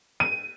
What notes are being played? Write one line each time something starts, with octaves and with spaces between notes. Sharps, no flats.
D#7